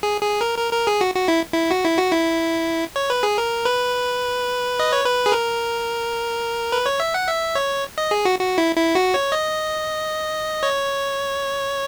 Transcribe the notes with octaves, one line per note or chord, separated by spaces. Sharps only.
G#4
G#4
A#4
A#4
A#4
G#4
F#4
F#4
E4
E4
F#4
E4
F#4
E4
C#5
B4
G#4
A#4
B4
D#5
C#5
B4
G#4
A#4
B4
C#5
E5
F#5
E5
C#5
D#5
G#4
F#4
F#4
E4
E4
F#4
C#5
D#5
C#5